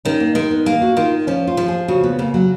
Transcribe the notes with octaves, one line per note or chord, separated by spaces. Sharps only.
D#3 C#4
A#3
D#3 G#3
B3
A#3 G#4
F#4
D#3 F4
F3 C#4
F4
F3
G#4
C#3 F#4
B3
C#3 A#3
F#3